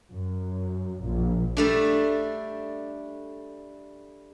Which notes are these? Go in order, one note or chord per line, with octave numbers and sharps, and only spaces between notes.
F#2
A#1
G3 A3 D4